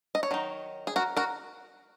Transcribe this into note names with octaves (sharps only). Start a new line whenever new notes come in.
D#5
C#5
D#3 F#3 D#4
G#4
F#4 A#4
F#4 A#4